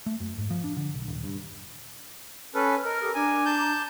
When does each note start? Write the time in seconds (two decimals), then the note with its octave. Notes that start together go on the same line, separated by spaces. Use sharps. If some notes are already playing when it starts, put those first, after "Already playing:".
0.06 A3
0.20 F#2
0.38 G#2
0.50 F3
0.64 D4
0.77 D3
0.94 B1
1.08 D#1
1.24 G2
2.54 C#4 A4 B4 F6
2.85 A#4 D#5
3.01 G4 A4 D#6
3.15 D4 G#5 A#5
3.45 A5 G6